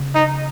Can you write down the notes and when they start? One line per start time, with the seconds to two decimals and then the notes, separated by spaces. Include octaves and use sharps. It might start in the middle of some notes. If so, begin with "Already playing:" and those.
Already playing: C#3
0.15 D#4